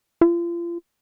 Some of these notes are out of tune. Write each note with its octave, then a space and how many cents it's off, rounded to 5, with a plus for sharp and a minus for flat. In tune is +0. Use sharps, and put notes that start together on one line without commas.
F4 -35